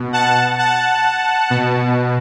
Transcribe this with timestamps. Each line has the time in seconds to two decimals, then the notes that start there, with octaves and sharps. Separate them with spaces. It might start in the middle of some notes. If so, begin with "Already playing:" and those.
Already playing: B2
0.13 F#5 A5
0.59 F#5 A5
1.50 B2